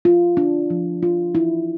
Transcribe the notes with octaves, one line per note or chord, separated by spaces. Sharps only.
F4
D4
F3
F4
E4